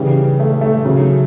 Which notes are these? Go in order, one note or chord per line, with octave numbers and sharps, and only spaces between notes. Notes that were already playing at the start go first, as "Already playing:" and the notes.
Already playing: C#3 E3 G3
A3
A3
C#3 F#3